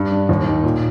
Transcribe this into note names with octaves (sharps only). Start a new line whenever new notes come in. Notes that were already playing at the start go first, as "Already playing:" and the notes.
Already playing: G2
D4
D#2
D#4
A#2